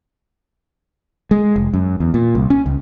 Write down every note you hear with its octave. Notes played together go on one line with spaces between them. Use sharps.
G#3
F1
F#2
E2
A#2
C2
C#4
C#2